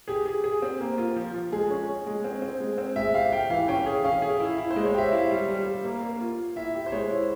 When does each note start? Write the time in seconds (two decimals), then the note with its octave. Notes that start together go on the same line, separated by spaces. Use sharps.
0.08 G4 G#4
0.26 G#4
0.44 G#4
0.62 C4
0.80 A#3
0.98 F4
1.16 F3
1.34 F3
1.52 G#3 G#4
1.71 C#4
1.88 C#4
2.06 G#3
2.24 C4
2.42 C4
2.60 G#3
2.78 C4
2.96 G#3 E5
3.14 G4 F5
3.32 G4 G5
3.50 E3 F5
3.68 C#4 G5
3.86 G#4
4.04 C#4 F5
4.22 G#4
4.40 E4
4.58 E4
4.71 C5
4.76 G#3
4.85 C#5
4.94 G4 E5
5.12 E4 F5
5.31 G3
5.48 G3
5.67 G3
5.84 A#3
6.02 A#3
6.21 F4
6.38 F4
6.56 E4 E5
6.75 G4
6.86 C5
6.92 G#3 C#5
7.10 E4